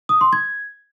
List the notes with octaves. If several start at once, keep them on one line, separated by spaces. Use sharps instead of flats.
D#6
C6
G#6